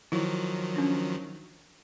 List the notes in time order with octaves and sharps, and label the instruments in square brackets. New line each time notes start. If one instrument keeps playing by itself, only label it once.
[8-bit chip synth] D#3 F3 F#3 [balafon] E4
[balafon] C#4 D4